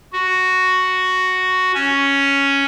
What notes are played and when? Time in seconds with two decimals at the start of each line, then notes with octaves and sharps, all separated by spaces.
0.13 F#4
1.74 C#4